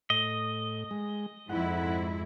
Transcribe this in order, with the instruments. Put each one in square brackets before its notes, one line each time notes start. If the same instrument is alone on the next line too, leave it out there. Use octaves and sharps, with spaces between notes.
[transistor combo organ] A2 [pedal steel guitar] D#5
[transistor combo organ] G#3
[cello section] F2 G#2 E4 [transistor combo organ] F#5